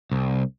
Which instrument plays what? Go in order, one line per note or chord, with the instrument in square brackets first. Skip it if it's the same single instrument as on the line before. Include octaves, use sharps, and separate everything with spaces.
[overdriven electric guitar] C2